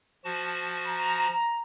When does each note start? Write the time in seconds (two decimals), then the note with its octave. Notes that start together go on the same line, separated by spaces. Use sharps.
0.24 F3 F#4 A5
0.86 A#5